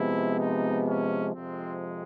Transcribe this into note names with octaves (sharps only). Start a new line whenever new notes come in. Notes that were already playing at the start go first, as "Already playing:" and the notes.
Already playing: C3 F3 G#3 B3 E4
D#4
C#4
F2 C3 F3 G#3 C4